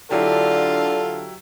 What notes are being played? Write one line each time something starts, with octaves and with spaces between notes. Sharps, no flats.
D3 F#3 E4 F4 G4 A4 D5